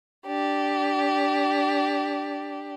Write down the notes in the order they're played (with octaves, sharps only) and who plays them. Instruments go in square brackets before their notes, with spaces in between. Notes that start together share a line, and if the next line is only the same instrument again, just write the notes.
[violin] D4 G4